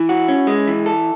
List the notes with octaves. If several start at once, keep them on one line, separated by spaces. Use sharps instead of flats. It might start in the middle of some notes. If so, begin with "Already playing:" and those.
Already playing: E3 E4
F#4
C#4
G#3
E3
A4